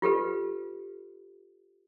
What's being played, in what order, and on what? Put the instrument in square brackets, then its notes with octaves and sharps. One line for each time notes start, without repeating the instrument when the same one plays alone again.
[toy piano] F4 G4 A4 B4